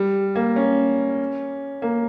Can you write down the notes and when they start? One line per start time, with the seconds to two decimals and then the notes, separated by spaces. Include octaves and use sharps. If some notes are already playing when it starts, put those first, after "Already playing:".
Already playing: G3
0.35 A#3
0.56 C#4
1.82 A#3